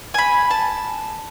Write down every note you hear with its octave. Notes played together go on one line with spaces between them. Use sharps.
G#5 B5
A5